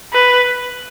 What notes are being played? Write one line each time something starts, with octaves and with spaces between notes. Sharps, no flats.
B4